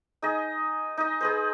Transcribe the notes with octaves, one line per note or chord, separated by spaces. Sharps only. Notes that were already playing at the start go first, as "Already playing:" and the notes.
D#4 G#4 D#5
D#4 D#5
G#4 B4 C5